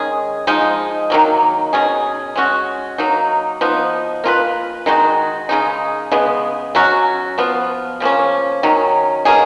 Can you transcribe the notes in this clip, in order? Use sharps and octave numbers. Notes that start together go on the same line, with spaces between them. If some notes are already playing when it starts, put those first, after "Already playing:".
Already playing: D#3 G#3 C#4 G#4
F3 G#3 D#4
D#3 F#3 A#3
B2 F#3 C#4 G#4
G#3 C#4 F#4
F#3 A#3 D#4
F3 B3 D#4
A#3 F4 G#4 B4
D#3 G#3 D#4 F#4
C#3 G#3 D#4
C#3 G#3 B3
F#3 C#4 F#4
F3 B3 F4
C#3 F3 A#3 C#4
D#3 F#3 C#4
B2 A#3 C#4 G#4